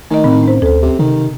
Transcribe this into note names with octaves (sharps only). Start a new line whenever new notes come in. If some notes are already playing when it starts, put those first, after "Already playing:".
D#3 A3 D#5
A2 C4
C#4 C5
D2 A4 C5
C3
C3 D#3